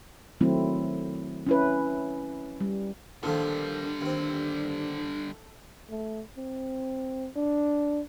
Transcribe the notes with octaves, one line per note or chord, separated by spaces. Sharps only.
D#3 F#3 A3 C4 E4
C#4 E4 B4
G3
A#2 D3 D#3 F3 G3 D4 A4
D#2 C4
A3
C4
D4